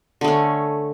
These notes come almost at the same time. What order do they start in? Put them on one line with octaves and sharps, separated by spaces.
D3 A3 C#4